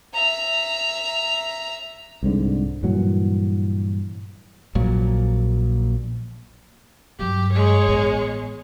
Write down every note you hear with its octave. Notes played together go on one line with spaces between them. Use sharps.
E5 A#5
C2 G#2 D3
G2 A#2 E3 F#3
A#1 A#2 F#3
G2 F#3 G4
G#3 C#5
A1 B3